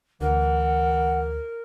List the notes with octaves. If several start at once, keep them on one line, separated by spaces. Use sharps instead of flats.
D2 E3 A#4 F#5